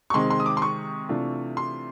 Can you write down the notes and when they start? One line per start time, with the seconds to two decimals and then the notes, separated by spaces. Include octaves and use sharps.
0.10 C#6
0.14 C3 D#3 G#3 C4 C6
0.30 C6
0.40 D#6
0.46 D6
0.57 C6
0.62 C#6
1.09 C3 E3 A3 D4 F4
1.57 C6